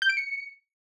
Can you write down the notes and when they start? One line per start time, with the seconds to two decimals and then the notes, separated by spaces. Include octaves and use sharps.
0.02 G6
0.09 D7
0.17 C#7